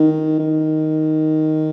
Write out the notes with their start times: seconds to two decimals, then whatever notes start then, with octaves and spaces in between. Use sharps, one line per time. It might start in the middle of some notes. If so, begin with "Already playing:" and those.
Already playing: D#3
0.39 D#3